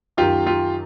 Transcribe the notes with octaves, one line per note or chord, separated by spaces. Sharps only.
F#2 D#3 F4 G4
F4 G4